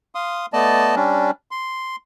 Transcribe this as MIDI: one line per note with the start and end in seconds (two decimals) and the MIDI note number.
0.15 0.46 77
0.15 0.46 84
0.15 0.46 87
0.53 0.95 57
0.53 0.95 59
0.53 0.95 74
0.53 0.95 75
0.53 0.95 81
0.96 1.31 55
0.96 1.31 61
0.96 1.31 62
1.51 1.96 84